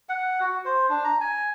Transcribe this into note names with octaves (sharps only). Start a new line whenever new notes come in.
F#5
F#4
C5
D4
A#5
G#5